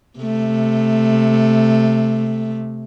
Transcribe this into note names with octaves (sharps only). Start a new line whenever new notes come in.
C3 A3